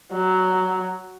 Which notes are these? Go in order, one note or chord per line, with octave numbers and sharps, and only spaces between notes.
F#3